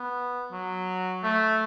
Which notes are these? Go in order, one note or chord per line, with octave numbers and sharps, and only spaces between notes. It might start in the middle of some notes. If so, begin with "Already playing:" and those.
Already playing: B3
F#3
A3